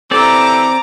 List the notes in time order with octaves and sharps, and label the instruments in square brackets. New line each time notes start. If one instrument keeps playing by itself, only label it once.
[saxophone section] E3 G4 A4 [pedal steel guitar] C4 D5 [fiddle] A#5 D6